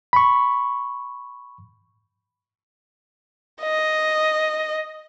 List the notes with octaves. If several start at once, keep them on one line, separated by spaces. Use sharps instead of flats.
B5 C#6
D#5